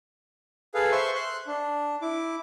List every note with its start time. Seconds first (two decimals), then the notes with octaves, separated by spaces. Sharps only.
0.74 G#4 A4 B4 F5
0.92 C5 E5 C6 C#6
1.15 C6 F#6
1.47 D4
2.02 E4 D6